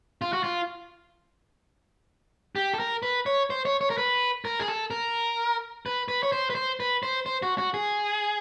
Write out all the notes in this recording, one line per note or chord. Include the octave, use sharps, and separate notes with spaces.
F4
F#4
F4
G4
A4
A#4
B4
C#5
C5
C#5
C#5
A#4
B4
A#4
G#4
A4
A#4
B4
B4
C#5
C5
B4
C5
B4
C5
C5
F#4
F#4
G#4